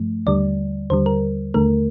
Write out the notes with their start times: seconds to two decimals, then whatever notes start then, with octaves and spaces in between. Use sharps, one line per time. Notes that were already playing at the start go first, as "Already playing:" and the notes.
Already playing: G2 F3 A3
0.27 D#2 D3 G3 D5
0.90 D#2 D3 G3 C5
1.06 A#4
1.54 D#2 D3 A3 A#4